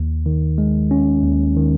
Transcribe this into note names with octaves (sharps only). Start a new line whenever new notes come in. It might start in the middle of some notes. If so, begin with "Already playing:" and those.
Already playing: D#2
D#3
G#3
C#4
D#2
D#3